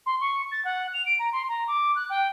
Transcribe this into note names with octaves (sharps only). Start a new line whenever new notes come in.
C6
C#6
A6
F#5
F7
D7
A#5
C6
A#5
D6
F#6
G5